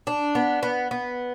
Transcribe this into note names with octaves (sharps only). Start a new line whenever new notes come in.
D4
B3
B3
B3